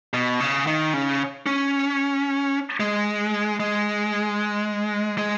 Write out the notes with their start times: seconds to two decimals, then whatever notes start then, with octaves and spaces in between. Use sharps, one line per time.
0.13 B2
0.40 C#3
0.67 D#3
0.94 C#3
1.46 C#4
2.80 G#3
3.60 G#3
5.18 G#3